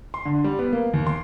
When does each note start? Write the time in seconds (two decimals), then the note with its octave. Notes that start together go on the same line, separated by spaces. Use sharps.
0.14 C6
0.25 D3
0.44 G3
0.59 B3
0.73 A#3
0.94 D#2
1.07 C6